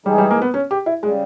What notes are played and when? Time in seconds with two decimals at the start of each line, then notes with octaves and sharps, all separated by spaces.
0.06 E3 G3 G#3 D#4 G#4
0.18 G3
0.31 A#3
0.42 B3
0.54 C#4
0.71 G4
0.86 E4
1.03 C#3 G3 G#3